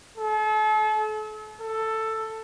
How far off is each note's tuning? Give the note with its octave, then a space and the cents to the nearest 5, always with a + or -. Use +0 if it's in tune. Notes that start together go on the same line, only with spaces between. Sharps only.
A4 -40
A4 +10